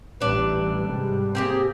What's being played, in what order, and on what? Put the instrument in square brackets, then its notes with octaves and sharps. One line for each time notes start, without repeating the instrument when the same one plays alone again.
[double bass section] A1 E3 G3 [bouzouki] D4 B4
[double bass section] G#2 C3 G3
[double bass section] A#3 [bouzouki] C4 G4 G#4